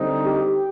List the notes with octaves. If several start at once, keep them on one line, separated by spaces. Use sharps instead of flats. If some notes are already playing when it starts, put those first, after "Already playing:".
Already playing: D3 G3 C4 D#4
G4